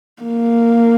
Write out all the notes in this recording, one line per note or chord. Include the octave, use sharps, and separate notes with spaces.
A#3